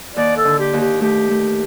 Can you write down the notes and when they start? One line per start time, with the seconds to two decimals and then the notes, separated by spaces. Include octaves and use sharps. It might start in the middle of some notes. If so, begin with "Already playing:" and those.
0.16 D#2 D5
0.37 A4
0.44 D3
0.59 G4
0.73 D#2
0.81 G4
1.01 A3 G4
1.30 A3